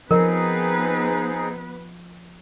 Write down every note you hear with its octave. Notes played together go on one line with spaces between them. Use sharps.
F3 B3 C4 D#4 G#4 A#4 B4 D#5